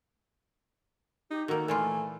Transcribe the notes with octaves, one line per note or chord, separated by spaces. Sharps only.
D#4 G4
D#3 A#3 F#4 A4
A#2 E3 A3 F4 G#5